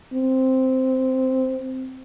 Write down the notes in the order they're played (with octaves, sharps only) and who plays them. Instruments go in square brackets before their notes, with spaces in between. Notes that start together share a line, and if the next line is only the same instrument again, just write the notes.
[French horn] C4